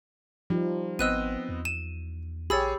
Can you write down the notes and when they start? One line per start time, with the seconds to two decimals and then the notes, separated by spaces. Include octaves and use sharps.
0.50 F3 G3 D#4
0.99 G#1 B3 C4 D#5 E6 F#6 D#7
1.49 E2
1.65 D#7 E7
2.50 A#1 G4 G#4 C#5 B5 E6 A6